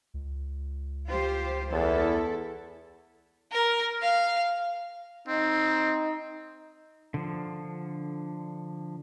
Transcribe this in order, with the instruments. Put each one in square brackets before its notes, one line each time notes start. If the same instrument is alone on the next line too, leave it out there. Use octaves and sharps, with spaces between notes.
[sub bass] C#2
[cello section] F4 G4 C5
[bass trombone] E2 [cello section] E4 A4
[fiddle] A#4
F5
[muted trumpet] C4 [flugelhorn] D#4
[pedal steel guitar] D3 F3